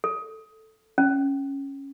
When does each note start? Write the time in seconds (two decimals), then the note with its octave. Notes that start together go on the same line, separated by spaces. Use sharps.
0.04 A4
0.98 C#4